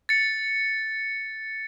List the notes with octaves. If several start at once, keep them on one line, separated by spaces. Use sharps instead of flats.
A6 C#7